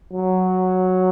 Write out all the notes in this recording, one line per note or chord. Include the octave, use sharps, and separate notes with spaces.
F#3